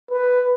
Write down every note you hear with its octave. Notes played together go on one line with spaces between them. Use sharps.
B4